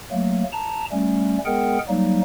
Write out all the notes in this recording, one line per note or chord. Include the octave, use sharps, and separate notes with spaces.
F#3 A3 A#3
A5 A#5
G3 A3 C#4
G#3 B3 G#4 A#4 F#5 G5
F#3 G3 A#3 D#4